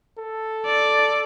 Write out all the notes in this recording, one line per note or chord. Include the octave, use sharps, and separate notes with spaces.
A4
D5